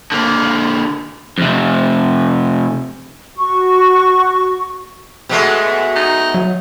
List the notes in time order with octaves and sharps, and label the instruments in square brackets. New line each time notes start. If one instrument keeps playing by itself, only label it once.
[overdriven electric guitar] D3 A#3
F2 C3
[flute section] F#4 C#6
[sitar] B2 G#3 A3
[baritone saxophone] D#4
[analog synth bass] F#3